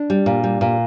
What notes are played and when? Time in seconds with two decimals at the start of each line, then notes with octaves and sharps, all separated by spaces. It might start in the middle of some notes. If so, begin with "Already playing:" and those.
Already playing: D4
0.10 G3
0.26 A#2
0.44 G3
0.61 A#2